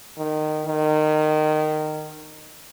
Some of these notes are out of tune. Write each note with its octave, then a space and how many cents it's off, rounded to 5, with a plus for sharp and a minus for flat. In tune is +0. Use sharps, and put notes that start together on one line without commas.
D#3 -20
D#3 -20